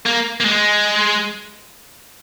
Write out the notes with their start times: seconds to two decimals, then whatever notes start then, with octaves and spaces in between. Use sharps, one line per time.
0.06 A#3
0.40 A#3
0.45 G#3